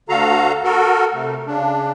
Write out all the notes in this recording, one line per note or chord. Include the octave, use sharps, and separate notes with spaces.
D2 D3 F#4 A4 F5 A#5
F#4 A4 A#4
C3 A3
C#3 D4